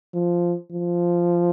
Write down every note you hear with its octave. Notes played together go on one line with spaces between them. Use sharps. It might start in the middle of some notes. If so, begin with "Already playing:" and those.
F3
F3